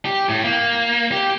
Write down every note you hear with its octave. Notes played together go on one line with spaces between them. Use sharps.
G4
A2
A#3
G4